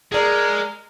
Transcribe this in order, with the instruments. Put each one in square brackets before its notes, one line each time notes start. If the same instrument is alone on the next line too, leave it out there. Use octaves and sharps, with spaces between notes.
[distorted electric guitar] G#3 [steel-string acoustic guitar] G#4 D5 [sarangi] A#4